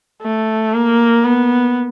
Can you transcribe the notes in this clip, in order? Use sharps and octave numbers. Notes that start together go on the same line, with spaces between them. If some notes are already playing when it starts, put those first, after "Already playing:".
A3
A#3
B3